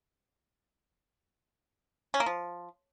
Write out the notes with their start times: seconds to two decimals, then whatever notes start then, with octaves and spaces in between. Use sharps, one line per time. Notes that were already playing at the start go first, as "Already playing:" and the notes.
2.14 C#4
2.20 A#3
2.26 F3